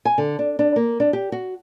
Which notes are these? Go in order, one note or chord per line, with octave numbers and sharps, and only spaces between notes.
G#5
D3
D4
D4
A#3
D4
G4
F#4